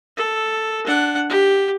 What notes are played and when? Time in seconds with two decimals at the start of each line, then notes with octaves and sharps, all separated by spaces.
0.17 A4
0.86 D4 F#5
1.29 G4